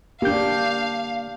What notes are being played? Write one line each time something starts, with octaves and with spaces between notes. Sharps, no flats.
A#3 D4 G4 F5 G6